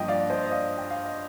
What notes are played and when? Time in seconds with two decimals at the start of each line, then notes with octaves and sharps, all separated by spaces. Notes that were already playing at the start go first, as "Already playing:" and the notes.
Already playing: G2 F3 A#3 D#5 G5
0.08 D5 F5
0.30 C5 D#5
0.46 D#5
0.51 D5 F5
0.78 G5
0.90 F5
1.04 D#5